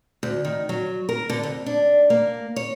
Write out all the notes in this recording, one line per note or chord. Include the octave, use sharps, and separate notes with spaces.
D2
D#3
F#3
A#4
D3
F2
D4
A#3
C#5